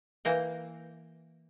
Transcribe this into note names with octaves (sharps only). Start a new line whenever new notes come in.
E3 A#3 G5